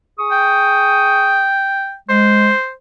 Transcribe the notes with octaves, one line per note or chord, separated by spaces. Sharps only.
G#4 C#6 D#6
G5
G#3 C5